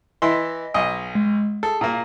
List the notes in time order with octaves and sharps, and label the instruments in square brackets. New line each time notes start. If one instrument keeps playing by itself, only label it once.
[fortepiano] E3 E4 C6 [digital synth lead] D#5
[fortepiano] B1 D#5 [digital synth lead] G#5
[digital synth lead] G#3
[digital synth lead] G#4 [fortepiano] A4
[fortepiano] A#2 A#3